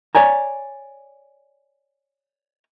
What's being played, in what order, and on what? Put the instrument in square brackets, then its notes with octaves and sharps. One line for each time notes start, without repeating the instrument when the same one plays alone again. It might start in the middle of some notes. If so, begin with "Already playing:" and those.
[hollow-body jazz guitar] C#5 D5 G#5 A#5